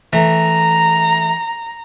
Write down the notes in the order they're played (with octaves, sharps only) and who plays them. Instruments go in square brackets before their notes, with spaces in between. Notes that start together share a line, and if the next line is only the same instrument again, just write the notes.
[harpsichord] E3 A3 [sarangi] A#5